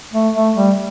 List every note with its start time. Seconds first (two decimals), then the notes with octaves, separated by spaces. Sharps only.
0.13 A3
0.35 A3
0.56 G3